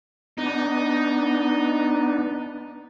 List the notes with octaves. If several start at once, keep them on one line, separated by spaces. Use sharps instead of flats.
B3 D4 D#4